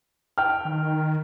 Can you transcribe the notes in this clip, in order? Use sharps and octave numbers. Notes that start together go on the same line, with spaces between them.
G5 F6
D#3